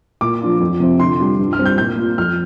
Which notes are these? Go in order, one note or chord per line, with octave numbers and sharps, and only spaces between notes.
A#2 D6
F3 D4 F4
F2
C3 F3 C4
D3 C6
G3 D4 F4
G2
F6
G3 C4
G6
A#2 G6
A#3 F4
F2 F6